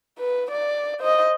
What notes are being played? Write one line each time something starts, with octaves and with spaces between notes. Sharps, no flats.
B4
D5
C5 D#5